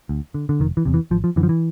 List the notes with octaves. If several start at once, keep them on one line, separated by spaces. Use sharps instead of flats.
D2
D3
D3
F1 D#3
E3
E2 C3
E3
G#1 F3
F3
F#2 D3 E3
F3
E3